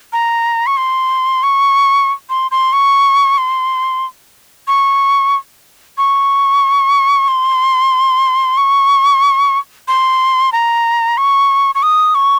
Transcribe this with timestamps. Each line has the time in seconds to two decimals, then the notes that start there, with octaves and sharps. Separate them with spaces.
0.13 A#5
0.67 C#6
0.77 C6
1.43 C#6
2.30 C6
2.51 C6
2.73 C#6
3.38 C6
4.68 C#6
5.98 C#6
7.28 C6
8.58 C#6
9.88 C6
10.53 A#5
11.17 C#6
11.75 C#6
11.83 D#6
12.15 C#6